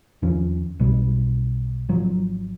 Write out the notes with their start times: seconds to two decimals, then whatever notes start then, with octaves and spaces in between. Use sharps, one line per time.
0.22 E2 D#3 F3 C#4
0.80 B1 B2 G3
1.89 G#1 F3 F#3